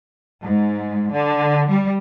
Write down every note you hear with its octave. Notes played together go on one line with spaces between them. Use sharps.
G#2
D3
G3